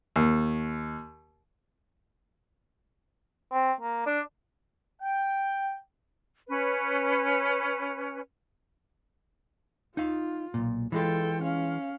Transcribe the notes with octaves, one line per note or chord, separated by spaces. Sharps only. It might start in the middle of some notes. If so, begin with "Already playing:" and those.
D#2
C4
A#3
D4
G5
C#4 B4
D#4 F4 F5
B1 A#2
E3 G#3 F4 A4 G5
C#4 F5